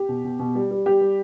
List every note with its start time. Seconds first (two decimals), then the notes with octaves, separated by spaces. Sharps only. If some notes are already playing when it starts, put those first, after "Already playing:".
Already playing: G4
0.09 B2
0.24 B2
0.39 B2
0.55 G3
0.71 G3
0.86 G3 G4
1.01 G3